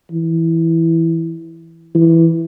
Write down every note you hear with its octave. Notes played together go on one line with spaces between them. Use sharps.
E3
E3